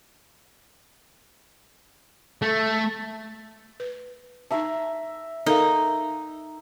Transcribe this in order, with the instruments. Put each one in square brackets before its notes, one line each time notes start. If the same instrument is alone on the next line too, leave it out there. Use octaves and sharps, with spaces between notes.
[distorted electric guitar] A3
[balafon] B4
[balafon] D#4 A5 [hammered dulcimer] E5 A#5
[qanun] D#4 [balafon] A4 A#4 F5